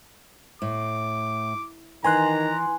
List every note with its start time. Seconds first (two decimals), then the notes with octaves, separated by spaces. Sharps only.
0.62 A2 D6
2.04 D#3 E3 G#5 A#5 C6 F#6